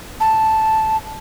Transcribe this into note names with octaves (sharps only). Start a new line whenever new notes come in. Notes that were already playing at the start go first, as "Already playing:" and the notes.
A5